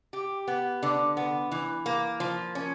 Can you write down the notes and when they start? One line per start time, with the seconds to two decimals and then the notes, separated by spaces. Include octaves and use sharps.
0.13 G4
0.48 B3
0.83 D3
1.17 B3
1.52 E3
1.86 A#3
2.20 F3
2.55 C#4